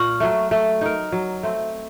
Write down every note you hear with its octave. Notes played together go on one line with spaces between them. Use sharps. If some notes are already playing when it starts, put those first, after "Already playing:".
Already playing: A#2 C#6 F6
F#3 A3
A3
D#4 A#4
F#3
A3 C4